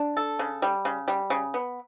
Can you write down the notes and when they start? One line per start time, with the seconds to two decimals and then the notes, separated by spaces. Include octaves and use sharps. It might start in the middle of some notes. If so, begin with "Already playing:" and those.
Already playing: D4
0.17 A4
0.39 C#3
0.62 G3
0.85 C#3
1.08 G3
1.30 C#3
1.54 B3